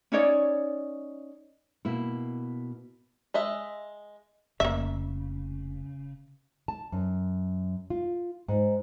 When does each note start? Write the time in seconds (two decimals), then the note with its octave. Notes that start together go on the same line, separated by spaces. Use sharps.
0.12 C#4 D#4 C#5 D5
1.85 B2 A#3 E4
3.34 G#3 D#5 E5
4.60 F1 C#3 A#3 E5
6.68 A5
6.92 F#2
7.90 F4
8.48 G#2